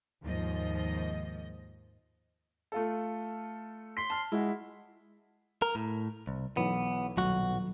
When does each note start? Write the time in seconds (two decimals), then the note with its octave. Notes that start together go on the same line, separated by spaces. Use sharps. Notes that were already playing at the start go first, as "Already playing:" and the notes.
0.23 D#2 G#2 F3 D#5
2.72 A3 F4 A4
3.97 C6 B6
4.10 A5 F6
4.32 G#3 E4 F#4
5.62 A#4
5.75 A2
6.27 C2
6.57 B1 E3 B3 E4
7.17 D#1 B1 F#3 F#4